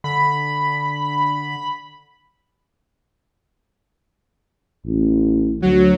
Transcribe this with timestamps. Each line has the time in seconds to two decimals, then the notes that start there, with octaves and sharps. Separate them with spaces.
0.04 D3 B5
4.86 A1
5.62 D2 F#3